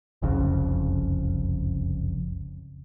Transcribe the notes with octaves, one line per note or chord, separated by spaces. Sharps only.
F#1 C2 F2 C#3